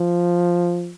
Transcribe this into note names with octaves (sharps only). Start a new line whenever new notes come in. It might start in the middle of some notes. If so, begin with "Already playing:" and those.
Already playing: F3